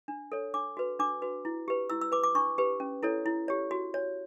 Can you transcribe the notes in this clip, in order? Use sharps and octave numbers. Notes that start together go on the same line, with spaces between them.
D4
A4 C#5
D4 D6
F#4 B4
D4 D6
F#4 B4
E4
G4 B4
E4 E6
E6
B4 D6
D6
D4 C#6
G4 B4
C#4
E4 A4 C#5
E4
G4 C#5
F#4
C#5